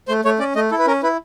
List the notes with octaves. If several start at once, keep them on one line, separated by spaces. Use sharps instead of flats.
A3 C5
A3 C#5
C#4 D5
A3 D#5
E4 A4
B4
C#4 A#4
E4 B4